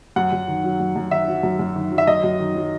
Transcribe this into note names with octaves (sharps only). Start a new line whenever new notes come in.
F#2 F#5
F#2
D#3
F#3
F#2
F#2
D#3 E5
F#3
F#2
F#2
D#3
F#3
E5
F#2 D#5
F#2
D#3
F#3